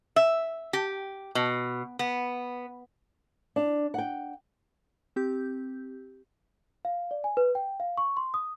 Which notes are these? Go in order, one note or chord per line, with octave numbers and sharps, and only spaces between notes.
E5
G4
B2
B3
D4
F#5 G5
C4 G4 G6
F5
D5
G#5
B4
G5
F5
C#6
C6
D#6